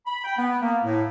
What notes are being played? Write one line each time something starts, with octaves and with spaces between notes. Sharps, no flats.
B5
G5
B3
A#3
A2